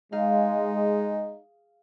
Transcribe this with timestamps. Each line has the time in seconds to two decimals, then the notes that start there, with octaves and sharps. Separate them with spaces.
0.13 G#3 D#4 G#4 F5